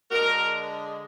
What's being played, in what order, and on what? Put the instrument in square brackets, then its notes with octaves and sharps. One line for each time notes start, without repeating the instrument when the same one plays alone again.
[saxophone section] D3 G#3 D4 F#4 A#4